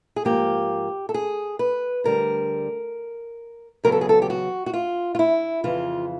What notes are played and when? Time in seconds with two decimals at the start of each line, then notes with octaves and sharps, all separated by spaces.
0.16 G#4
0.25 G#2 F3 A#3 G4
1.09 A4
1.14 G#4
1.59 B4
2.04 D2 D3 G3 A#4
3.84 E2 C#3 F#3 B3 A#4
3.92 A4
4.01 G#4
4.09 A4
4.22 G4
4.30 F#4
4.66 F#4
4.74 F4
5.15 F4
5.19 E4
5.64 F2 C#3 E3 F4